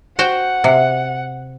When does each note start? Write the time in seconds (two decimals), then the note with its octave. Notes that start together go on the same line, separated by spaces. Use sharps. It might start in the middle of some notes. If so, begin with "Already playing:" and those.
0.19 F#4 C5 F#5 G5
0.64 C3